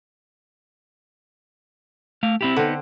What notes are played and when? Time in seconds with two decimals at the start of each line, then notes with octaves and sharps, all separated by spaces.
2.23 A3 F5
2.41 C4 E4 G4
2.56 D3 B3 C4 D#4